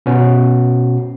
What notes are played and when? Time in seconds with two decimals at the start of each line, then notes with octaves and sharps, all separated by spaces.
0.06 B2 C#4 F#4